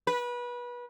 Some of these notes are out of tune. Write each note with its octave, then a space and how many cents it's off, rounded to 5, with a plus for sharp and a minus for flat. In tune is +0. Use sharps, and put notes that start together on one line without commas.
B4 -25